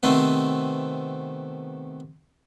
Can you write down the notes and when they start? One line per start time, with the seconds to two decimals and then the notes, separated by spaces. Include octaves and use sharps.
0.03 C3 D#3 A3 B3 C4